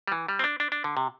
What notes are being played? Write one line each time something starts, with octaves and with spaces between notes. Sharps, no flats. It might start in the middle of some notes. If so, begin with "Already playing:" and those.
G3
E3
G3
C4
D4
D4
D4
D3
C3